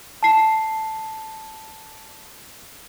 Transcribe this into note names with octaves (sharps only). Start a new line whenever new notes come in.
A5 C7